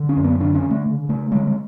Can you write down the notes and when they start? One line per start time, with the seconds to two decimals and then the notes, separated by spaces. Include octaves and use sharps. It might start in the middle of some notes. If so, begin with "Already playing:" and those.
Already playing: D3
0.09 C#4
0.17 F#2
0.24 B3
0.40 D3 D4
0.55 C#4
0.63 D3
0.71 A3
0.86 C#3
1.09 C#3 A3
1.32 D3 G#3
1.47 G#3